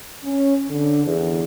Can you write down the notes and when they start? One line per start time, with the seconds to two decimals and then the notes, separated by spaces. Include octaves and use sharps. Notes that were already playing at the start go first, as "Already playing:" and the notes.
0.24 C#4
0.69 D3
1.05 E2